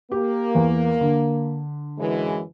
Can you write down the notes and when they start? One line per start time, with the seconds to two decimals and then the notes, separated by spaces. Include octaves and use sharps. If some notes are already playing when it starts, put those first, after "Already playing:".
0.12 A#3 G4
0.55 E2
1.01 D3
1.98 F#2 E3 G#3